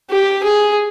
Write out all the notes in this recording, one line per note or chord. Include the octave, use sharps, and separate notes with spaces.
G4
G#4